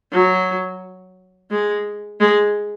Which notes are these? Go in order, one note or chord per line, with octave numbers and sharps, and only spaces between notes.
F#3
G#3
G#3